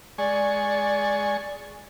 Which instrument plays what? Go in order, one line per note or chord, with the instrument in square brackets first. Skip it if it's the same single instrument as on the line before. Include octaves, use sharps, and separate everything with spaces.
[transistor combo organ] G#3 G#5 C#6 [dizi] D5